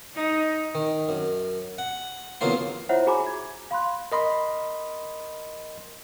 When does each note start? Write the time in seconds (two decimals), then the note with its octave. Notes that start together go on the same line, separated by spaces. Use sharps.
0.15 D#4
0.75 D#3
1.09 F#2
1.78 F#5
2.41 E2 C#3 F#3 A#3 F4 C6
2.89 E4 F4 C5 C#5 E5 F#5
3.07 F#4 G#4 G#5 A#5 B5 D6
3.27 G#6
3.71 F5 B5 C6 F#6
4.12 A#4 D#5 B5 C6